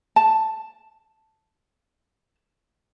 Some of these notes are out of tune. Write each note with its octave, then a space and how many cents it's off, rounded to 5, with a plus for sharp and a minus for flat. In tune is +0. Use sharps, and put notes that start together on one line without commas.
A5 +0